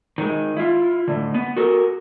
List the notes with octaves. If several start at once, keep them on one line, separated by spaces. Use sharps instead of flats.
D#3 G#3
E4 F4
A2 D3
B3
F#4 A4 A#4